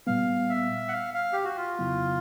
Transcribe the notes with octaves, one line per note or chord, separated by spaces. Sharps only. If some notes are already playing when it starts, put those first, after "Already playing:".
A#2 G3 B3 F5
E5
F#5
F5
F5
G4
F#4
F4
F2 C#3 F#3 B3 E4